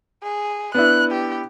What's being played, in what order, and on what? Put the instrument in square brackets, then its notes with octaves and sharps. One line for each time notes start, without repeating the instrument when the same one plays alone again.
[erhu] G#4
[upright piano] B3 D4 E4 [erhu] F#6
[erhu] G4